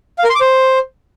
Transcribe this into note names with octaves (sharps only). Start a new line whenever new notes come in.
F5
A#4
C6
D6
C5